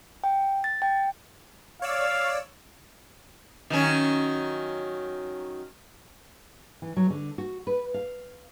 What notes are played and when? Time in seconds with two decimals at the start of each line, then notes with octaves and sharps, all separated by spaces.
0.24 G5
0.64 A6
0.82 G5
1.82 C#5 D5 F5 E6
3.70 D#3 F#3 C#4
6.82 E3
6.97 F#3
7.10 D3
7.38 F#4
7.67 B4
7.94 F5